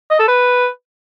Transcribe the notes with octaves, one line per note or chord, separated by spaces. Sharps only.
D#5
A4
B4